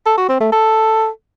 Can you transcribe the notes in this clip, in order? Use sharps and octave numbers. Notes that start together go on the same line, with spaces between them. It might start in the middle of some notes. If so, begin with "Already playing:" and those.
A4
F#4
C4
A3
A4